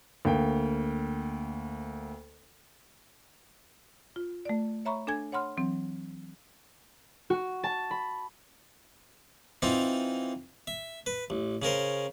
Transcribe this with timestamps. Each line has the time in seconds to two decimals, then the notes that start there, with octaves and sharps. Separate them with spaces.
0.25 D2 A#3 G5
4.16 F4
4.45 A3 D5
4.85 C#5 E5 A#5 B5 C#6
5.07 D4 A4 G#5 G#6
5.32 C#5 F#5 B5 C6 F6
5.57 E3 F#3 C4
7.30 F#4
7.63 A5
7.91 B5
9.62 E3 C4 D#4 F4
10.67 E5
11.06 B4
11.30 A1
11.62 C#3 C#4 A#4 C5